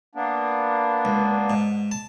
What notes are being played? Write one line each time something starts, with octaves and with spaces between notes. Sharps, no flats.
A#3 B3 D4
C#2
G#2
A5